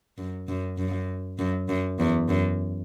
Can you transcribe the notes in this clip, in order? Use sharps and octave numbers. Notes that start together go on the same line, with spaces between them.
F#2
F#2
F#2
F#2
F#2
E2
F#2